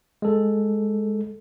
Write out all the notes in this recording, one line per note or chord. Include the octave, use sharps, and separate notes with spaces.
G#3 A4